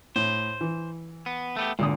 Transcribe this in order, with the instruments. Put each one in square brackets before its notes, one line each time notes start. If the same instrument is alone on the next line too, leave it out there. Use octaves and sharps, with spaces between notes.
[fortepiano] A2 [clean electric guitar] C5
[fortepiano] E3
[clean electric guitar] B3
A3 B3 G4
[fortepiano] G#1 D3 D#6 [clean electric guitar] A#2